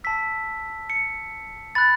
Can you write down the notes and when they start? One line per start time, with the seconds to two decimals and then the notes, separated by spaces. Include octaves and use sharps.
0.04 A5 E6 B6
0.90 C#7
1.75 B5 F#6 A6